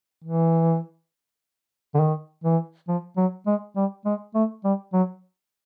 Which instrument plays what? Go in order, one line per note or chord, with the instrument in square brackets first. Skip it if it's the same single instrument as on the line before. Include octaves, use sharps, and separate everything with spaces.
[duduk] E3
D3
D#3
E3
F3
F#3
G#3
G3
G#3
A3
G3
F#3